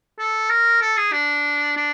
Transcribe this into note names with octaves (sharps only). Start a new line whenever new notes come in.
A4
A#4
A4
G#4
D4
D4